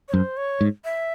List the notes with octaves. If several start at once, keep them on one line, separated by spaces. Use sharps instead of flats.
C#5
F#2 C5
C#5
G#2
E5